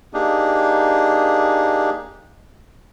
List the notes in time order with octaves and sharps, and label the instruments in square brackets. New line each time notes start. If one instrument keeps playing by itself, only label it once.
[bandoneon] A#3 D4 D#4 G4 G#4